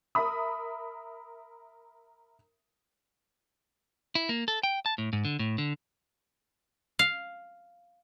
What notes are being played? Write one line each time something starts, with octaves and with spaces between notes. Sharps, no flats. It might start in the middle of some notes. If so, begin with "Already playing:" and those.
A#4 E5 B5 D#6
E4
A#3
A4
G5
A5
A2
G#2
D3
A2
D3
F5